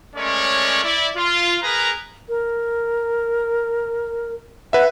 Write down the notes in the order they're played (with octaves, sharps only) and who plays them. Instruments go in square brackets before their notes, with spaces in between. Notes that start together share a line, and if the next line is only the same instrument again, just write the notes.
[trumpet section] G#3 A3 C#4 A#4 C#5 D5
E4 D5
F4
G#4 A#4 B4 A#5
[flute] A#4
[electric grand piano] B4 E5 [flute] F#5